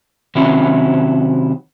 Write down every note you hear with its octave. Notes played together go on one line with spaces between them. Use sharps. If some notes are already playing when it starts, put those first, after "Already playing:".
C3 D#3 F#3 C#4 E4